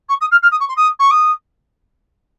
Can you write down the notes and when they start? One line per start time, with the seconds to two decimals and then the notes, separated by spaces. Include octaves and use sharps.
0.09 C#6
0.21 D#6
0.31 F6
0.43 F6
0.51 D#6
0.60 C#6
0.69 C6
0.77 D#6
0.99 C#6
1.11 D#6